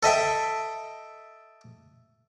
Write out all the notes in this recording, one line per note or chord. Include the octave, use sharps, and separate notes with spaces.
A4 D#5 E5 G5